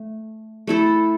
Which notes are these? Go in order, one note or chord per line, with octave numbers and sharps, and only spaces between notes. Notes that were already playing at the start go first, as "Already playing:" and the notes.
Already playing: A3
A3 E4 A4